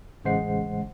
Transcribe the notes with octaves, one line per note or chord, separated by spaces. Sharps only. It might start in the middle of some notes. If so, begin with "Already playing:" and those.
A1 C#3 G#3 C5 F#5 C7